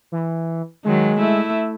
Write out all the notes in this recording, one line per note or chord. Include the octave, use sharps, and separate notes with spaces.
E3
D#3 F#3 G#3
A3 E4